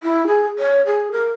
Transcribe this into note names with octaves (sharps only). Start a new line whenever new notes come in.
E4
G#4
C#5
G#4
A#4